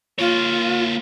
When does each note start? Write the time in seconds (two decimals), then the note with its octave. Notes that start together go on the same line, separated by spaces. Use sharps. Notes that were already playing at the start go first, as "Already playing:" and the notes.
0.19 A#3 F4 C#5